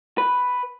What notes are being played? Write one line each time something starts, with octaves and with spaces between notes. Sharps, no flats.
B4